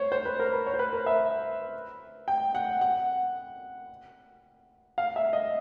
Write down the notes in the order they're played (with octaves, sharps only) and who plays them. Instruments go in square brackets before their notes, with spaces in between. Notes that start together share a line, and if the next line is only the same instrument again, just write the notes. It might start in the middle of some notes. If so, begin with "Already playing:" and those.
Already playing: [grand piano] C5 C#5
C5
B4
A#4
B4
C#5
C5
B4
A#4
E5
G5
F#5
F#5
F5
E5
D#5